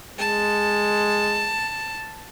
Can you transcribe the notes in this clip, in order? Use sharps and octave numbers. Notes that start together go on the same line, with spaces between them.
G#3 A5